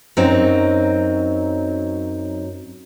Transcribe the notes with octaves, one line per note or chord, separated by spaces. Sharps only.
F#2 F#3 C4 D#4